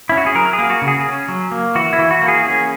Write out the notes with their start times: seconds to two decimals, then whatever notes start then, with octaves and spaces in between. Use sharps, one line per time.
0.09 C#4 E4
0.17 F#4
0.26 G#4
0.35 F#3 A#4
0.53 G#4
0.59 A#3
0.70 F#4
0.82 C#3
0.88 G#4
1.05 C#4
1.28 F#3
1.52 A#3
1.75 E3 F#4
1.93 E4
1.98 E3
2.11 F#4
2.22 A#3
2.28 G#4
2.45 C#4 G#4